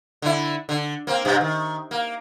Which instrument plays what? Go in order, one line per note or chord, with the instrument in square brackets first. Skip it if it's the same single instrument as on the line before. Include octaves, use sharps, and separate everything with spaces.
[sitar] D3 E4
D3
A#3 C4
G2 C3
D#3
A#3